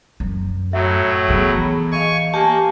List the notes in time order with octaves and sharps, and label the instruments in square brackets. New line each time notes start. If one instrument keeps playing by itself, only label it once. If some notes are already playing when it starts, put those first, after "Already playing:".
[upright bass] F#2
[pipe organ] A2 F#3 [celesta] E5
[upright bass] D#3 E3 [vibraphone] B3 G#4
[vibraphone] D#5 F5 [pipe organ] G#5 C#6
[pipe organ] A#3 [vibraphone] G4 G#5 [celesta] A5